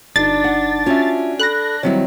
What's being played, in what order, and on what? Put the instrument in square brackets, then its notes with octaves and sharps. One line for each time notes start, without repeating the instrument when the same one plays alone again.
[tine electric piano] G1 D#4 [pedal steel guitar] D4 [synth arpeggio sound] A6
[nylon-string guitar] F#5
[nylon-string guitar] C#4 F#4 [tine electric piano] F4 E5
[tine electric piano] A4 B5 [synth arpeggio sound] F#6 A#6
[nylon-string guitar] D#3 F#3 E4 [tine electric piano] G3 C4 C#5